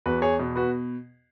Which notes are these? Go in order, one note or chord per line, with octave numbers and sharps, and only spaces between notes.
E2 F#4 B4
G#4 C#5
B2
F#4 B4